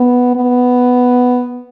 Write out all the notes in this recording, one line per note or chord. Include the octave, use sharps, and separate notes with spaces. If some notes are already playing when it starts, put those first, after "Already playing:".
Already playing: B3
B3